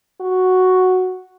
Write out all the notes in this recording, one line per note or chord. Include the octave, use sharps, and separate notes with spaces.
F#4